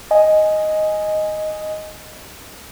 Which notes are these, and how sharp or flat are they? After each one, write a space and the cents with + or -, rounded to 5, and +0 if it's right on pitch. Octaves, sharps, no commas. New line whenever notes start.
D#5 +0 G#5 +5